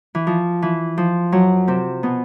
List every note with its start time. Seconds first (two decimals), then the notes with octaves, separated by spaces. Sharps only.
0.15 E3
0.27 F3
0.62 E3
0.98 F3
1.32 F#2 F#3
1.67 C3 C4
2.03 B2 B3